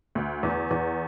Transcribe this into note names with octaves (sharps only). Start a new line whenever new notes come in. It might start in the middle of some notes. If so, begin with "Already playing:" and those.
D2
E2
E2